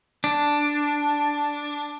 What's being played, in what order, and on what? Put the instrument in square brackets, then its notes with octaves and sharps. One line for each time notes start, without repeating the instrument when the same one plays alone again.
[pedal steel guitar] D4